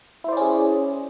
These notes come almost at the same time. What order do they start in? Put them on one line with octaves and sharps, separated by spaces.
E4 C5 D5 C#4 G#4